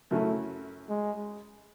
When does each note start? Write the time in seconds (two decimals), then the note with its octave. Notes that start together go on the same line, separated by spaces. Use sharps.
0.11 F#2 C#3 F#3 A3 C#4 E4
0.89 G#3